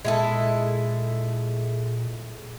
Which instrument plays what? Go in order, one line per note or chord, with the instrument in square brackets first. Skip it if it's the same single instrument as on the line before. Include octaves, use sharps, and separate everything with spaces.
[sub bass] A#2 [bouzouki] G#3 E4 A4